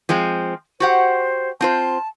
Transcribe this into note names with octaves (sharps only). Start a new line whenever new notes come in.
F3 G#3 C4
F#4 G4 C5 F#5
C4 F4 C5 A5